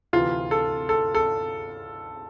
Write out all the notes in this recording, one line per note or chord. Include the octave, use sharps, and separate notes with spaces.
D2 C3 E3 F4
A4
A4
A4